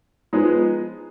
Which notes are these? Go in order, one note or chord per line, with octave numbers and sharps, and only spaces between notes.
F3 G#3 B3 D#4 G#4